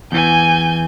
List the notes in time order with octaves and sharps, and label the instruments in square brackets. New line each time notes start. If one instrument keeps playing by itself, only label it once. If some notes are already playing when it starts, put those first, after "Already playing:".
[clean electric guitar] E2 E3 [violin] G#5 G6